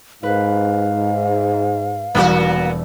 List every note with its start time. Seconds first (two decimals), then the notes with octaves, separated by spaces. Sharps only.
0.23 G#2 B4 F5
2.15 E1 G3 A#3 B3 E4 F#4